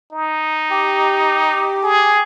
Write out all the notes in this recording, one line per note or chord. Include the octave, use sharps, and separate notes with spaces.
D#4
G4
G#4